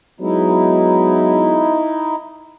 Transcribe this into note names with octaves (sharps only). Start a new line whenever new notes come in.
F#3 G#3 B3 D#4 E4